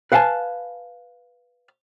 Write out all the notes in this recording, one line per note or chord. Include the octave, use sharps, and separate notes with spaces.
B4 F5 F#5 G#5 A5